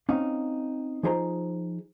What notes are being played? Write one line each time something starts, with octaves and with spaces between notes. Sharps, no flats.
C4 C#4 D#4 F5
F3 D#4 G#4 C5 G5 A#5